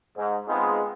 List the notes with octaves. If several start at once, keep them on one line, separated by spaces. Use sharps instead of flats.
G#2
G#3 B3 C4 D#4 F4 G#4